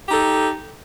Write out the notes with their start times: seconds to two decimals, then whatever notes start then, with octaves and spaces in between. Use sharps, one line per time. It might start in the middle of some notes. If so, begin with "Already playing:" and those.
0.08 G4
0.11 D#4
0.14 A4